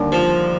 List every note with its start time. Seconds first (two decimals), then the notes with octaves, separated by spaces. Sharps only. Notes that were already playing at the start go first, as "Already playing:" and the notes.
Already playing: D#2 D3 G3 A#3
0.12 F3